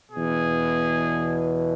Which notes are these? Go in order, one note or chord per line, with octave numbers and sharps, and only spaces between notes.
E2 B2 G#4